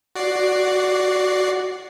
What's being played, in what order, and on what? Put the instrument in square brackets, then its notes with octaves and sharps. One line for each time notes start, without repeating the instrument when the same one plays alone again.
[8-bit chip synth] F#4 D5 C7